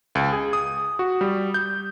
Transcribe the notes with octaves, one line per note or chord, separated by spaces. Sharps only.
C#2
G#4
D#6
F#4
G3
G6